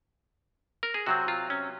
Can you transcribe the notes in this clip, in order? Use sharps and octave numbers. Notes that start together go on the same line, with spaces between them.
A#4
G#4
C3 F#3 C4 F#4
F4
C#4